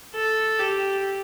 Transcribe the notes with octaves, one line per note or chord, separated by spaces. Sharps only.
A4
G4